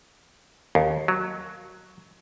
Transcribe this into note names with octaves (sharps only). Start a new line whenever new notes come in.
D#2
F#3